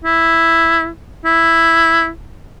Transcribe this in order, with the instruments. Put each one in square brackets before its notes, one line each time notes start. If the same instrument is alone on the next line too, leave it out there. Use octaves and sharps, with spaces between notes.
[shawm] E4
E4